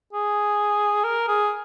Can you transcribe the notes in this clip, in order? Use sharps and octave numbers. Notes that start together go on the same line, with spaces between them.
G#4
A#4
G#4